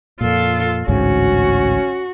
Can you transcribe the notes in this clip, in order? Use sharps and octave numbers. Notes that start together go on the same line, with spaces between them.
F2 A#2 F4 A4
A1 D2 G#2 C#4 F#4